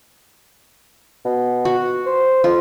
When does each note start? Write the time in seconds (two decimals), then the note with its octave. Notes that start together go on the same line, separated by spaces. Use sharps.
1.25 B2
1.65 F#4
2.06 C5
2.44 F2 F4